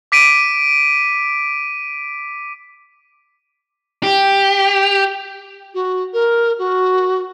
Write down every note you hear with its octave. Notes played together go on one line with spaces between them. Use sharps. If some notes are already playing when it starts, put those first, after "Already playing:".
D6 B6 D7 D#7
G4
F#4
A#4
F#4